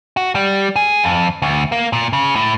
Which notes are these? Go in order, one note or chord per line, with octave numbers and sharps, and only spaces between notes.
F#4
G3
G#4
F2
D2
A#3
A#2
C#3
A2